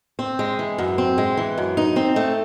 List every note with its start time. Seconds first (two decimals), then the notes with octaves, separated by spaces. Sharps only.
0.19 C4
0.39 G#3
0.59 E3
0.78 F#2
0.98 C4
1.18 G#3
1.37 E3
1.58 F#2
1.77 D#4
1.96 C4
2.16 A3